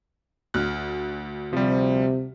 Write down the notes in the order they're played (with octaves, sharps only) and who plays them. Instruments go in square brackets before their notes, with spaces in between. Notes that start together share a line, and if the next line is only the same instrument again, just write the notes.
[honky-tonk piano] D2 [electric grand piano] F6 F#6
[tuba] C3 [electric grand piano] F3 G3